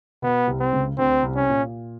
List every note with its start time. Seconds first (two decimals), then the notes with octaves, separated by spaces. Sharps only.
0.22 B2 B3
0.47 C2 C3
0.60 C4
0.73 C#2 C#3
0.98 D2 D3 C4
1.23 C2 C3
1.36 C#4
1.49 A#2